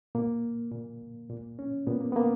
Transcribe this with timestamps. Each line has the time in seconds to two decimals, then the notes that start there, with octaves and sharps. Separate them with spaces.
0.15 A#2 A#3
0.71 A#2
1.30 A#2
1.59 C#4
1.87 A#2 B3
2.01 A#3
2.12 B3
2.16 A#3